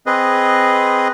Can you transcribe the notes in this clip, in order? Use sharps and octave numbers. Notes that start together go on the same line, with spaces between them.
C4 G#4 B4 D#5